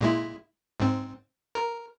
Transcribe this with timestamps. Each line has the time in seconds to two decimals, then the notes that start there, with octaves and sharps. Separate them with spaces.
0.01 A#2 G#3 E4
0.80 G#2 C4
1.55 A#4